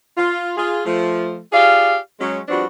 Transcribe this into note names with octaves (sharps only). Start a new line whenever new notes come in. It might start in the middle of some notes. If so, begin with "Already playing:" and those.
F4
F4 G#4
F3 A3
F4 G4 G#4 D5 F5
F#3 G#3 C#4
F3 G3 B3 C4 D4 F#4